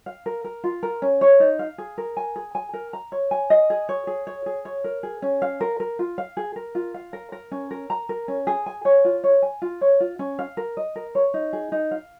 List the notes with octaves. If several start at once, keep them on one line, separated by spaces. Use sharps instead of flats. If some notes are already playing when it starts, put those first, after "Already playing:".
F5
A#4
A#4
F4
A#4
C#4
C#5
D#4
F5
G#4
A#4
G#5
G#4
G#5
A#4
A#5
C#5
G#5
D#5
G#4
C#5
G#4
C#5
G#4
C#5
A#4
G#4
C#4
F5
A#4
A#4
F4
F5
G#4
A#4
F4
F5
A#4
A#4
C#4
A#4
A#5
A#4
C#4
G#4
G#5
C#5
F4
C#5
G#5
F4
C#5
F4
C#4
F5
A#4
D#5
A#4
C#5
D#4
G#4
D#4
F5